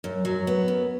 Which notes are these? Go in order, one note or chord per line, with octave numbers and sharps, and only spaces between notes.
F#2
F#3
B3
F#2